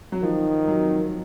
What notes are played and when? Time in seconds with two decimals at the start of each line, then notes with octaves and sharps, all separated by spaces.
0.12 F#3
0.22 D#3 F3
0.67 F#3